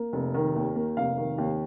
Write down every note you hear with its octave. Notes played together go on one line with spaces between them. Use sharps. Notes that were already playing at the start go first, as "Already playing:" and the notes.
Already playing: A#3
F1
D#3
D#2
A#3
F1 F5
D#3
D#2